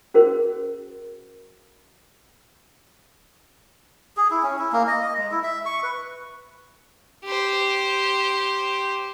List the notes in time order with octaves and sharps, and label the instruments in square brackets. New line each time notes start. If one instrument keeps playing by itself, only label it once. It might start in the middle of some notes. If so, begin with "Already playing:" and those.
[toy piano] C#4 F#4 G#4 A#4 C5
[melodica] G#4
E4
C#4
E4
A#3
D#5
D#5
G#3
E4
E5
C#6
B4
[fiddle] G4 C5